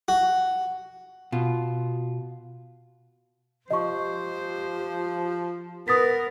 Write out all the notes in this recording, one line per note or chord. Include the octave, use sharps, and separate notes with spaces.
F#4
B2 F4
F3 G4 C5 D#5 C#6
B3 A#4 B4 D#6 A6 B6